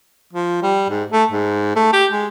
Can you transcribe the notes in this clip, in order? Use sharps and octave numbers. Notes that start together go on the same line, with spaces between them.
F3
G3
G#2
A3
G#2
A3
G4
G#3